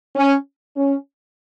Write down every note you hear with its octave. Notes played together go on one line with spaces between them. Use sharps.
C#4
C#4